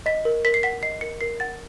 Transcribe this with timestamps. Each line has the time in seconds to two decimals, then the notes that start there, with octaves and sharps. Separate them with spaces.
0.06 D#5 B6
0.25 A#4
0.45 A#4 B6
0.54 C7
0.63 F#5 B6
0.83 D#5 C7
1.01 A#4 C#7
1.21 A#4 C7
1.40 F#5 A6